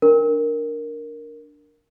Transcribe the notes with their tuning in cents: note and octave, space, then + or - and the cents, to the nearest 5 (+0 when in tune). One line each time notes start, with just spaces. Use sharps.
D4 +0 A#4 +0